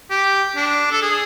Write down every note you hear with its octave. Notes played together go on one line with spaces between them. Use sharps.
G4
D4
A4
G#4